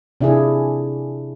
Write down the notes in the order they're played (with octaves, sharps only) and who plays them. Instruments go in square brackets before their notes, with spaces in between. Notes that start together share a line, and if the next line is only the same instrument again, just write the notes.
[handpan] C3 D4 E4 F4 G#4